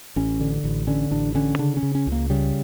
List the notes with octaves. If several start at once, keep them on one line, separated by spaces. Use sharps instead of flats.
A1 C#4
D3
A1
D3 C#4
A1 D4
D3 C#4
C#3 D4
C#4
C#3
C#4
C#2
A#3
C#3 G3